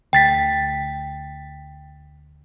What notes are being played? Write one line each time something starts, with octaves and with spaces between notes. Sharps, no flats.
D2 G5 A6 B6